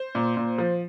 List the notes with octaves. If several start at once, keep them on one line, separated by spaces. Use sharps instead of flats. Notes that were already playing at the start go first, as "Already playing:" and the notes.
Already playing: C5
A#2
A#2
F3